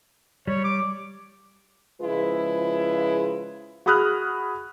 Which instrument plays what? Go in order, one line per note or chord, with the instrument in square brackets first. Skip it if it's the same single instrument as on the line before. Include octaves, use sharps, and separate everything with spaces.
[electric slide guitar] G3 [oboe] C#5
[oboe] D6
[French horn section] C#3 F3 G#3 E4 F4 B4
[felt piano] F#4 G#4 B5 D#6 F6 F#6